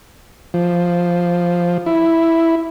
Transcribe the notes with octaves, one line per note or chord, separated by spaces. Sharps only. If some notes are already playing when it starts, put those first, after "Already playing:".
F3
E4